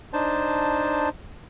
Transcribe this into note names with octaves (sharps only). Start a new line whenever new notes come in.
D4 D#4 C5 A5